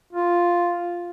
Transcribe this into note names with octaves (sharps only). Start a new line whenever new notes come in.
F4